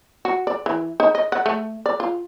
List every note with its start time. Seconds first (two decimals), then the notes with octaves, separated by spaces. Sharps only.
0.25 F#4
0.47 D5
0.66 E3
1.00 D#4
1.15 D#5
1.32 F#5
1.46 A3
1.86 D5
2.00 F4